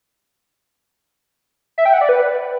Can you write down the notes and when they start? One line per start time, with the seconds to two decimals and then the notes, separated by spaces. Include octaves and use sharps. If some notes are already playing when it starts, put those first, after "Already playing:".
1.78 E5
1.85 G5
1.93 F#5
2.01 D5
2.09 B4